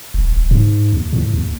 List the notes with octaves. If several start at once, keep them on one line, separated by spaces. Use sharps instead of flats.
D#1
D1
G#2
D#2
A2
D#2